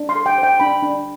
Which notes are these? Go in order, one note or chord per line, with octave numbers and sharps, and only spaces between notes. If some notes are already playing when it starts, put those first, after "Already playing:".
Already playing: D4
C6
A4
G5
C5
G5
D4 B5
D4